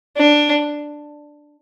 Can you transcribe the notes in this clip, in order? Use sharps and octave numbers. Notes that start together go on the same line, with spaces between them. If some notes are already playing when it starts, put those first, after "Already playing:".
D4